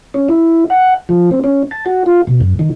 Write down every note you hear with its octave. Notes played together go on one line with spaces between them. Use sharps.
C#4
E4
F#5
F3
C4
C#4
A5
F#4
F4
B2
F#2
D#3